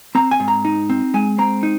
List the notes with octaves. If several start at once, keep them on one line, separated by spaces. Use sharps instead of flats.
C4 A#5
G#5
G#2
A#5
D#4
C4
G#3 G#5
C4 A#5
D#4